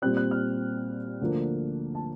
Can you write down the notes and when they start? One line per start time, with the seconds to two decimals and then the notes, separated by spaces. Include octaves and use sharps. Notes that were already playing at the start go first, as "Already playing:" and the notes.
0.02 A#2 G3 C4 F#6
0.17 F#6
0.31 F6
1.21 D2 D3 F3 A#3
1.95 A5